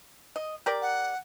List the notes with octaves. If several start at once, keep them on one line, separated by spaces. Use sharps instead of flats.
D#5
G4 A#4 D5
F#5